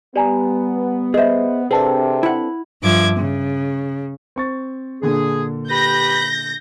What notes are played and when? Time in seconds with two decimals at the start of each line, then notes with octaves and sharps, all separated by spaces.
0.16 G3 B3 D5 G#5 A#5
1.14 G#4 C5 D#5 E5
1.71 C3 C4 D4 G#4 A4 B4 A5
2.23 E4 E5 F#5
2.82 G2 F3 E5 D6 G#6
3.15 C#3
4.36 C4 C#6 A6
5.02 A#2 D3 D4 G#4
5.70 G4 B4 B5 G6 A#6